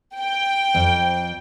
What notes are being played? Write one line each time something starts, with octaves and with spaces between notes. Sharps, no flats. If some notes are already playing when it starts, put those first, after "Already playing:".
G5
F2 C5